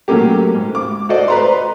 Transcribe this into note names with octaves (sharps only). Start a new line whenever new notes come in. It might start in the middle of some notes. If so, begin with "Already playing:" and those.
F#3 A3 A#3 C#4 G4
G#2
D6
F#4 A4 C5 D5 D#5
B4 A#5 C6